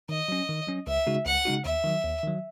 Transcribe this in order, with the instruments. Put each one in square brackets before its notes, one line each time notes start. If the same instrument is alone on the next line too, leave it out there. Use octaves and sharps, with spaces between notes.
[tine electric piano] D#3 [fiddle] D#5
[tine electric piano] F#3 C#4
D#3
F#3 C#4
[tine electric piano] C#2 [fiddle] E5
[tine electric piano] C#3 G#3 D#4 F#4
[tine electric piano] C#2 [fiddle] F#5
[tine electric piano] C#3 G#3 D#4 F#4
[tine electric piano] D#2 [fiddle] E5
[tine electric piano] D#3 F#3
D#2
D#3 F#3